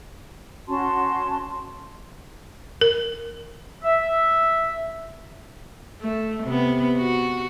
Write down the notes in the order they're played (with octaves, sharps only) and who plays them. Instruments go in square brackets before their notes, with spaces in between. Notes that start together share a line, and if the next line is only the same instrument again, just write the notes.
[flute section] C#4 F#4 A5 C6
[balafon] A#4
[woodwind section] E5
[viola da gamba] A3
C3 B3
F#4